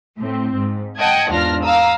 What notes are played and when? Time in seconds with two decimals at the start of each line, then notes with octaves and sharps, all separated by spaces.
0.18 A2 C4
0.55 G#2
0.98 D#5 F#5 G5 A5 G#6
1.31 E2 G#2 D4 F4 F6 A#6
1.63 F5 A#5 D#6 E6